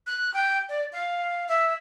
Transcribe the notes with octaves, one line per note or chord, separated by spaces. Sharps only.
F#6
G5
D5
F5
E5